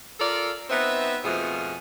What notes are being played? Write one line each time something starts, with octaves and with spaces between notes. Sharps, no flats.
F4 A4 A#4 D5
B3 C4 D#4 B4 E5
F2 B2 F3 A3 G#4